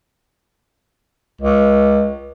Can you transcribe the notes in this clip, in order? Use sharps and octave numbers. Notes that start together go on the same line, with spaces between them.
C#2